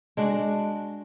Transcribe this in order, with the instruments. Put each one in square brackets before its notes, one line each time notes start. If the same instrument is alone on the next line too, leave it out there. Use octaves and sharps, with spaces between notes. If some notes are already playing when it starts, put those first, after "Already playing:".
[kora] G#3 D4 F#4